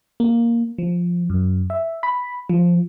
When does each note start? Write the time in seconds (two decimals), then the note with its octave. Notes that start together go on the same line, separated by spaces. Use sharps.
0.20 A#3
0.78 F3
1.30 F#2
1.70 E5
2.03 B5
2.50 F3